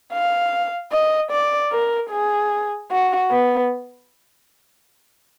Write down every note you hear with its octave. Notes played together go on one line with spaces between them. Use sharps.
F5
D#5
D5
A#4
G#4
F#4
B3